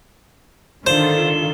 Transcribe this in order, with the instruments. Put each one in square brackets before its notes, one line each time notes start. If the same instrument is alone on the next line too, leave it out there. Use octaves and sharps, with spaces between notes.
[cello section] D3 F4 A4 [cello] D#3 [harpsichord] C5 [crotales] E7 G7